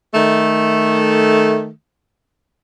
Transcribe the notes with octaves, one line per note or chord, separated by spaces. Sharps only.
D#3 A3